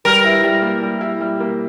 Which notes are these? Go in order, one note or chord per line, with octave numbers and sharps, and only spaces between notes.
G3 A#4
E4
G3
A#3
G3
E4
G3
A#3